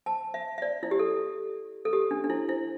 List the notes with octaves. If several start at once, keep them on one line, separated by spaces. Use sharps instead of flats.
A5
E5
E5
D5
E4
G4
A4
A4
G4
D4
D4
E4
E4